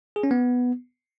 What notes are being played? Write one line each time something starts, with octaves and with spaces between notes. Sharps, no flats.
G#4
C#4
B3